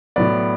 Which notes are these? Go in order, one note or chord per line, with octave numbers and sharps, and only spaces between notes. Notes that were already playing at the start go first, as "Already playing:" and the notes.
A2 F#3 B3 D5